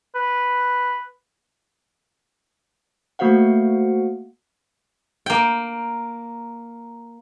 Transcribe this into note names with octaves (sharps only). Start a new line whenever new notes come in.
B4
A3 A#3 F#4 C5 F5 F#5
A#3 G5